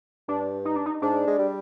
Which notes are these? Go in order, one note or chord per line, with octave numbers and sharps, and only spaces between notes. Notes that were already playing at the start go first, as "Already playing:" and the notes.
G2 D4
D#4
D4
D#4
G#2 D4
G#3
G3